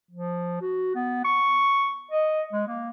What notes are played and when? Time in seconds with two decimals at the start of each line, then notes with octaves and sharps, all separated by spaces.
0.11 F3
0.61 F#4
0.95 B3
1.25 C#6
2.11 D#5
2.53 G#3
2.67 A#3